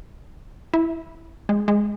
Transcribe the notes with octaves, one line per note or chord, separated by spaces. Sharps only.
E4
G#3
G#3